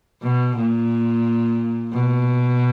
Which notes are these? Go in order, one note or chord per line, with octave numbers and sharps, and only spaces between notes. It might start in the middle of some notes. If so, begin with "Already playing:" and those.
B2
A#2
B2